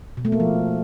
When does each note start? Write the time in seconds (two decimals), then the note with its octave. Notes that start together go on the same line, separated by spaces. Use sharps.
0.17 B2
0.25 A3
0.32 A#3
0.40 F3